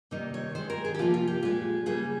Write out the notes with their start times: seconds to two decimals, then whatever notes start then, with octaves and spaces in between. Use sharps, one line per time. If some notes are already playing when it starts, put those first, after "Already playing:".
0.11 C3 D#3 G3 A#3 D#4
0.34 C#5
0.55 D#3 G#3 C5
0.70 A#4
0.84 G#4
0.94 G4
0.99 C3 F3 A#3 F4
1.14 F4
1.27 G4
1.43 A#2 G#3 F4
1.86 C#3 G3 A#3 G#4